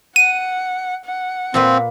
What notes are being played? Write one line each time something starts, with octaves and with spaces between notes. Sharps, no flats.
F#5 D#7
F#5
A#2 A#3 C4 B4